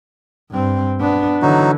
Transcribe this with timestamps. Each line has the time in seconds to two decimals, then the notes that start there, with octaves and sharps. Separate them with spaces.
0.51 G2 C4
1.00 B3 D4
1.42 D3 E3 F#3 D#4 F#4